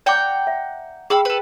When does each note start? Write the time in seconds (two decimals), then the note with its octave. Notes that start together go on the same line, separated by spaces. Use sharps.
0.06 D5 F#5 G5 A#5 D6
0.47 E5
1.10 G#4 F5 G5 B5 E6
1.25 A4 B4